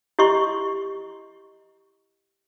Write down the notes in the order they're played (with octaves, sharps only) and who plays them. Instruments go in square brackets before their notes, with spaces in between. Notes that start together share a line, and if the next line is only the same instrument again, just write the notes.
[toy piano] E4 G4 D#5 C6 C#6